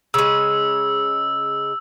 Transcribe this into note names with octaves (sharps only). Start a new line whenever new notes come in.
C#3 G#3 E6